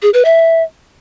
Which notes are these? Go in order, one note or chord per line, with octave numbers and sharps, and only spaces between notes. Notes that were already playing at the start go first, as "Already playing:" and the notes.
G#4
B4
E5